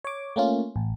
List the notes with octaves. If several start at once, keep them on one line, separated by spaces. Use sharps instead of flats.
C#5 D6
A3 A#3 C#4 F4
A1